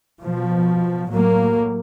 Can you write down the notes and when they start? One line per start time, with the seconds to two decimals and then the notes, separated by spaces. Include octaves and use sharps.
0.20 B2 F3
1.08 A2 F#3 A#3